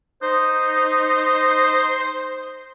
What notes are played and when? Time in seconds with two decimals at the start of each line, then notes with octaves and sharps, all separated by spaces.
0.23 D#4 C5